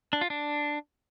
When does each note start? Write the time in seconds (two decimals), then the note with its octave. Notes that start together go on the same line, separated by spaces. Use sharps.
0.13 D4
0.21 F4
0.30 D4